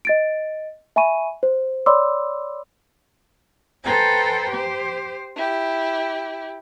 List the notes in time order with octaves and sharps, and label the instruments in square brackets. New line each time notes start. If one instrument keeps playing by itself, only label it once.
[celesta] D#5 A6 D7
E5 G#5 B5 C#6 D#7
C5
C#5 D5 B5 C6 D6 E6
[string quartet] A4 B4 C5 G5 G#5 A#5
G4 C5
E4 G4